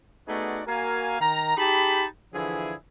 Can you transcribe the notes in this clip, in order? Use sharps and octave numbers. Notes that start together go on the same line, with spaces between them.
A3 B3 D#4 F#4 G#4 D5
A#3 F#4 A#4 F5 G#5
D#3 A#5
D#4 G4 G#4 A5 B5
D3 E3 F3 E4 G#4